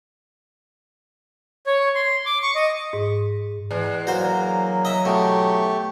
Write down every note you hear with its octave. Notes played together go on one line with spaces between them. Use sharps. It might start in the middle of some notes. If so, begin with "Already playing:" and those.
C#5
C6
D6
C#6
D#5
G#2
E2 G#3
F#3 A#3 F#4 C5
D#5 E5
B2 A3 G4 C#6